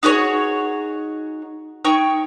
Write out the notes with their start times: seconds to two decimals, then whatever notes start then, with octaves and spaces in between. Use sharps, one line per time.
0.03 D#4 F#4 G#4 C#5
1.85 D#4 C#5 G5 C#6